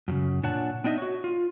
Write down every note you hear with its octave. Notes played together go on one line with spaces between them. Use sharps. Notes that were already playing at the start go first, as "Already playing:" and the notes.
F#2 A2 C#3
A#2 D4 C#5 F#5 A5
B3 D4 D#4 D#5 E5
F#4 C#5
F4